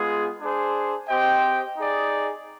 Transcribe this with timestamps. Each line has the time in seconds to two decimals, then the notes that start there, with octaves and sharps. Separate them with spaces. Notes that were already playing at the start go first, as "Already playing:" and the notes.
Already playing: G#3 B3 F4 G#4
0.41 D4 G#4 C5
1.08 C4 G4 C5 D#5 G5
1.76 D#4 G#4 D5